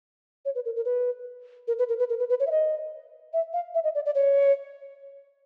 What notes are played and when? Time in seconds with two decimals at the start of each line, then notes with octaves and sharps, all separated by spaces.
0.45 C#5
0.55 B4
0.65 A#4
0.76 A#4
0.85 B4
1.68 A#4
1.79 B4
1.89 A#4
1.99 B4
2.09 A#4
2.19 B4
2.29 B4
2.40 C#5
2.47 E5
2.51 D#5
3.33 E5
3.53 F5
3.74 E5
3.84 D#5
3.95 D5
4.06 D5
4.15 C#5